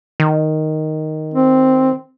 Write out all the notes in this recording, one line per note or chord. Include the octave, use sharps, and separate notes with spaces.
D#3
C4